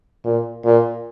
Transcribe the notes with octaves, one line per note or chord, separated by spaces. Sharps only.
A#2
A#2